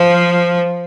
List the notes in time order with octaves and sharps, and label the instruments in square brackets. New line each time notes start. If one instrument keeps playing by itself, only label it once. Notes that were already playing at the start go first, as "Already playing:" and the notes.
Already playing: [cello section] F3